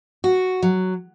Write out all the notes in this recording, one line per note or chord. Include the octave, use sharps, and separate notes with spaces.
F#4
F#3